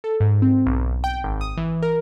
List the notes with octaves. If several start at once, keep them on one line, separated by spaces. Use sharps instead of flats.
A4
G#2
C4
B1
G5
G#1
D#6
E3
A#4